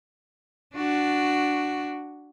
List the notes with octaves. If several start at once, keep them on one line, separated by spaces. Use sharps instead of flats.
D4 F#4